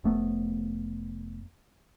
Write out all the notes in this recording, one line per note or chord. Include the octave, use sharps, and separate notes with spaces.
F1 A3 B3